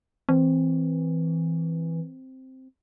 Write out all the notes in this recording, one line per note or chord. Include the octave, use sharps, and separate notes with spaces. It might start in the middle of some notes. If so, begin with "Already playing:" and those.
E3 C4